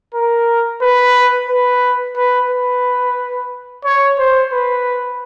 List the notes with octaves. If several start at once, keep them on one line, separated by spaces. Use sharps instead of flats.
A#4
B4
B4
B4
B4
C#5
C5
B4